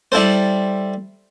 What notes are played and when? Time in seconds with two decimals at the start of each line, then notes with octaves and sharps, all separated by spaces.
0.12 G3 E4 A4 C5